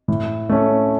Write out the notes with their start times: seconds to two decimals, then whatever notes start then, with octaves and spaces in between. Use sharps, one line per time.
0.08 A2
0.49 A3 C#4